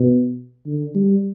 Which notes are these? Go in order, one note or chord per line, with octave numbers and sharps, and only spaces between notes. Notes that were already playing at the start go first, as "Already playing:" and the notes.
Already playing: B2
D3
G3